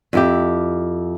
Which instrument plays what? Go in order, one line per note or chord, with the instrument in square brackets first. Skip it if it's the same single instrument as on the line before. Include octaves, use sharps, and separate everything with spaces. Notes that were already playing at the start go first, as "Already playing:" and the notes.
[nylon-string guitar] F2 E4 G4